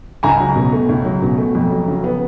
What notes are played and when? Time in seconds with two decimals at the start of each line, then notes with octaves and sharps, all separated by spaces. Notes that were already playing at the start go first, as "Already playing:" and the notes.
0.23 C#2 G#5 A#5
0.40 F#3
0.56 B2
0.72 A3
0.89 C#2
1.05 F#3
1.22 B2
1.37 A3
1.55 F2
1.71 F#3
1.88 C#3
2.04 B3